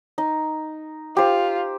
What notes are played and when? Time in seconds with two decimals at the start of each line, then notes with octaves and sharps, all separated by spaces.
0.18 D#4
1.17 F4 G4 C5